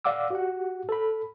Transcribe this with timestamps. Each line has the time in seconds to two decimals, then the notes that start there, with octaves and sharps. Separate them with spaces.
0.05 D5 F5 F#5 D6 E6
0.30 F#4 G4 F#5
0.89 A4 B5